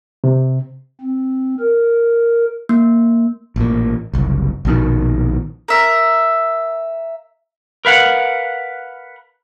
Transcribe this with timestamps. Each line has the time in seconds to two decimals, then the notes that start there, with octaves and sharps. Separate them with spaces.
0.24 C3
1.01 C4
1.60 A#4
2.69 A#3
3.56 A1 A#2
4.14 F#1 C2
4.65 A#1 B2 D#3
5.68 A#4 E5
7.85 A#4 B4 F5 F#5